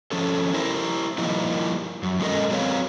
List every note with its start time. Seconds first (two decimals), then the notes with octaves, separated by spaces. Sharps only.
0.12 F3 C#4 A4
0.53 E4 A#4 C5
1.18 F3 G3 A#3 D#4 E4
2.03 F#2
2.20 G#3 C#4 D4 A4 A#4 D#5
2.51 F#3 C4 B4 C#5 D#5 F5